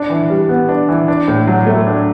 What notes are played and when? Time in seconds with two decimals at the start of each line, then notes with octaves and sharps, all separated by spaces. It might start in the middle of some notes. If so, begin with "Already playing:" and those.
Already playing: D4
0.10 E3
0.30 G3
0.49 B3
0.69 D4
0.89 E3
1.08 D4
1.28 A2
1.47 F#3
1.67 A3
1.87 D4